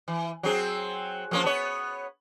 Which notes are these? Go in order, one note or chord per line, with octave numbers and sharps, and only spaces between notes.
E3
F#3 C4 G#4
F3 A#3 C#4
B3 C#5